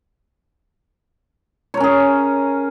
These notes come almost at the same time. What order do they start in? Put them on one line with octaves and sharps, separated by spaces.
C#5 A#4 C#4 G#4